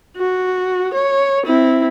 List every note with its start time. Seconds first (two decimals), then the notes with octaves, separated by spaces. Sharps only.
0.17 F#4
0.94 C#5
1.46 C4 E4